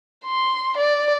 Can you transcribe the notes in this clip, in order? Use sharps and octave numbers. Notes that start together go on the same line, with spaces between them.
C6
D5